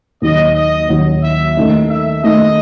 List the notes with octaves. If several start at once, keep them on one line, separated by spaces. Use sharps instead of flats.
D#2 D#3 F#3 D#5
D#5
D#2 D#3 F#3
E5
D#3 A3 D#4
E5
D#3 A3 D#4 D#5